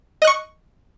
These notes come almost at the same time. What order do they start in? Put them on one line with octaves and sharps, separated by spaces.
D#5 F#6 C#6